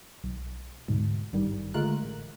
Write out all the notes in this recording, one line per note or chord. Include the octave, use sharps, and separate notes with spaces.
B1
D2 G#2 B2
G#1 G2 D#3 G3
D3 G#3 A3 F4 A#4 F#6
A1